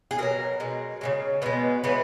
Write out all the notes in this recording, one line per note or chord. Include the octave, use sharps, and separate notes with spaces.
G#4
B2 F#3 A#4
B2 G#3
C#3 E3 G#3
B2 G#3 B3
C#3 E3 G#3 B3